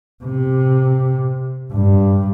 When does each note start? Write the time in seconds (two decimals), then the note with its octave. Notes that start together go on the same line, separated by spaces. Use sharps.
0.24 C3
1.73 G2